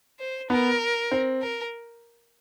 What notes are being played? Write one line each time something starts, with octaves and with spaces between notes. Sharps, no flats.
C5
B3 A#4
C4
A#4